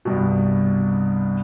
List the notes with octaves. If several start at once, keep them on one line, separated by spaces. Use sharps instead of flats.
C2 G2 B2